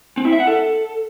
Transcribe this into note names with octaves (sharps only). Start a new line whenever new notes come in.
C4
E4
E5
F#5
A4